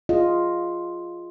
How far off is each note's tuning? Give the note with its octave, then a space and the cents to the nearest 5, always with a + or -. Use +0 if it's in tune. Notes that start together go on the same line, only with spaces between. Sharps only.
F4 +0 G#4 +0 D#5 +0